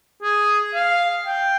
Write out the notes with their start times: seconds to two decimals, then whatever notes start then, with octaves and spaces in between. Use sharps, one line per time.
0.22 G#4
0.74 F5
1.26 G5